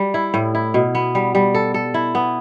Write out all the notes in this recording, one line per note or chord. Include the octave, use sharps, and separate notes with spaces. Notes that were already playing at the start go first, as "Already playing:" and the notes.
Already playing: G3
E4
A2
E4
B2
B3
G3
G3
A4
A4
E4
B3